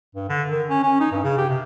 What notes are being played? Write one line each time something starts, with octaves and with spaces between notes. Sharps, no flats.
G2
D3
D#3
C#4
C#4
D#4
G2
C#3
G4
C3